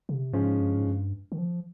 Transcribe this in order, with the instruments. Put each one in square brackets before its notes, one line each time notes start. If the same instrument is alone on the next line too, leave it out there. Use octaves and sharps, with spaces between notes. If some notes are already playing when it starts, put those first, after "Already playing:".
[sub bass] C#3
C3
[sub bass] G#2 [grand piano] C#3 F3 G#3 C#4
[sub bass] G2
G#2
G2
D#3
F3